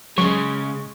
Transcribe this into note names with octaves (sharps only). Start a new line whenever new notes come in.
C#3 F#3 G#3 C#6